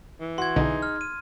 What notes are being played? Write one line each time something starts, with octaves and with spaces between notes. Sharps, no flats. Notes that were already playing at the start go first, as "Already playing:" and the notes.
E3
F#4 C6 G#6
B1 D3 D#4 G#4
F6
D#7